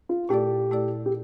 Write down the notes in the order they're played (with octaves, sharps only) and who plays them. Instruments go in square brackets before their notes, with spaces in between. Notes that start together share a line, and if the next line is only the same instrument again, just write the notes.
[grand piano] F4
[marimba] A#2 A3 E4 A4 D5 [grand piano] G4
[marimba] A#2 A3 E4 A4 D5
[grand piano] G4